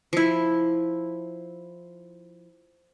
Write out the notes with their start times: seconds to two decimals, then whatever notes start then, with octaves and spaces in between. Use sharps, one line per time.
0.13 F3 E4